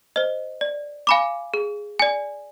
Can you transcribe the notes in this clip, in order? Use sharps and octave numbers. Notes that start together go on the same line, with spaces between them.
C5 D#5
D5
F5 G#5 B5 D6
G#4
D5 G#5